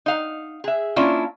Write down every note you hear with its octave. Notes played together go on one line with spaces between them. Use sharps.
D#4 F5
G#4 E5
A#3 C#4 D4 E4 F4